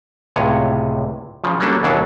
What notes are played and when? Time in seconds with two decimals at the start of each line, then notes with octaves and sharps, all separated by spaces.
0.36 C#2 A2 C3 C#5 G#5
1.44 C#3 F3
1.60 F#3 G3 A#3 C#4 D4 A4
1.83 D#2 B2 E3 F#3 D4 A4